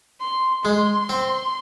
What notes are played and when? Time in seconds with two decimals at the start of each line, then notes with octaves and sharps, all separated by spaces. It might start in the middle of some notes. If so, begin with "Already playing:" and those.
0.21 C6
0.64 G#3 C6
1.09 C4